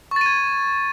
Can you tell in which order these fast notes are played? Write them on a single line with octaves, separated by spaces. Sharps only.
C#6 A6 D#7 G#6